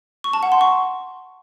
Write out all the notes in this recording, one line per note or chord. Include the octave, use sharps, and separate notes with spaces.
C#6
A5
F#5
C6
C#6